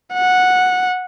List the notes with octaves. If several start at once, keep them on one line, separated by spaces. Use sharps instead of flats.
F#5